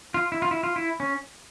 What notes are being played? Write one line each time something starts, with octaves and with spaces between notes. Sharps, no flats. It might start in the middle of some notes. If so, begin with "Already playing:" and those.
F4
E4
F4
E4
F4
E4
C#4